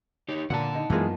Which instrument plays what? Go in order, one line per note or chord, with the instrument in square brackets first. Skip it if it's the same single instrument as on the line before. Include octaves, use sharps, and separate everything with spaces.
[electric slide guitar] D#4 G4 C#5
[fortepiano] A#2 [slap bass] D3 [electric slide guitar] F#5 A5
[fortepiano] D#4
[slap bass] F#2 B3 [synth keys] E3 G#3 [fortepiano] A#3 D#4 F4